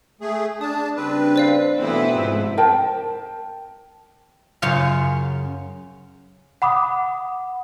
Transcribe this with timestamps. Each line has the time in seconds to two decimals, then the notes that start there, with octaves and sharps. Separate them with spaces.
0.21 A3 G#4
0.61 D4 A5 D#6
0.96 C#3 G3 C4 D4 B4
1.36 C5 D5 F5
1.80 B2 E3 F#3 A3 B3 C4 E4 B4
2.14 G#2 C3 F3 G#3
2.57 A#4 C5 G5 A5
4.62 F#2 C#3 C#4 F4
6.62 F#5 B5 D6 D#6